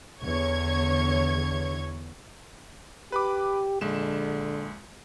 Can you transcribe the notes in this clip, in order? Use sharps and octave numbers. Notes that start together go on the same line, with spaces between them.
E2 D3 C#5 C#6 G#6
G4 B4 B5 D6
A#1 D3 G#3 E7